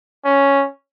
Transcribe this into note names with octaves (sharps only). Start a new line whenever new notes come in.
C#4